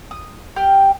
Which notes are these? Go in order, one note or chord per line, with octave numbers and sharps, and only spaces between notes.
D#6
G4 G5 F6